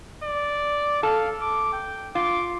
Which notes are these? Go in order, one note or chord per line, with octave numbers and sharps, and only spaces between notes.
D5
A4 F5
D6
G5
F4 D6